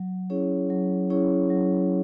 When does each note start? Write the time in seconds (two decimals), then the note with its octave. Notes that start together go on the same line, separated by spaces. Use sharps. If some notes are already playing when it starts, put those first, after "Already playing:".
Already playing: F#3
0.30 C#4 E4 G#4 C#5
0.70 F#3
1.10 C#4 E4 G#4 C#5
1.50 F#3